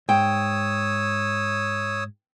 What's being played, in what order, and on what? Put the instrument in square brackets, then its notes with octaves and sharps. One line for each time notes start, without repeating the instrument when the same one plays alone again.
[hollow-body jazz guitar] G#2 [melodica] C#5 D#6 E6 [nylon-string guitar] G5